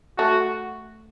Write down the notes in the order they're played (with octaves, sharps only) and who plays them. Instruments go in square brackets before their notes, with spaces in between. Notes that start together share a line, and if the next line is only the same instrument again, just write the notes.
[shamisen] A3 [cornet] F#4